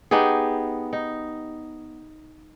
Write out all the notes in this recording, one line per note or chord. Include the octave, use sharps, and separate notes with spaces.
B3 D#4 G4 G#4
D#4